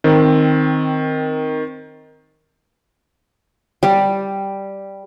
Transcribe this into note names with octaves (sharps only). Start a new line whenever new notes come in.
D#3 C4
G3